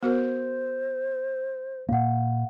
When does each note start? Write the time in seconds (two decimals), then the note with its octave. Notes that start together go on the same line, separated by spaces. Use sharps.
0.03 B3 F#4 A#4 C5
1.89 A#2 A#3 F5 F#5